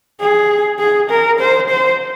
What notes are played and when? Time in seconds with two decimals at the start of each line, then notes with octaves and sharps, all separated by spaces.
0.20 G#4
0.79 G#4
1.10 A#4
1.40 C5
1.70 C5